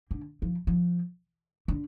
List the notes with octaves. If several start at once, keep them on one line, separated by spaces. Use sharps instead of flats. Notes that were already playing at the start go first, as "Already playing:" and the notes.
D3
F3
F3
D3